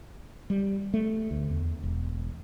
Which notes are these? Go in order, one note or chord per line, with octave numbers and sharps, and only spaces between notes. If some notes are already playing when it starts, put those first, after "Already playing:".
G3
A3
D2
E2
E1